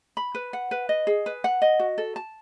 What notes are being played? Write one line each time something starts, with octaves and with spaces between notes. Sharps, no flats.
B5
B4
F#5
B4
D#5
G#4
B4
F#5
D#5
F#4
A4
A5